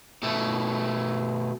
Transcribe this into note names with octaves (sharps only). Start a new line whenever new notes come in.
B2 A3